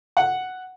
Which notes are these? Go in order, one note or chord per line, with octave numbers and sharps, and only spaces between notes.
F#5